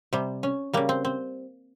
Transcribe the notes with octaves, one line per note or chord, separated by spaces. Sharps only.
C3 G3
C#4
C#3 G3 A#3
C4
C4